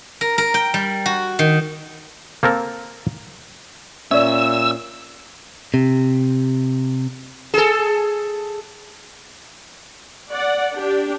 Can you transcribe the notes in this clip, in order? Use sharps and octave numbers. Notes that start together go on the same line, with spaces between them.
A#4
A#4
G5
G3
F#4
D#3
A#3 C4 A4 A#4
A#2 C#4 D5 E5 E6
C3
G#4 A4
D5 F#5
D4 G4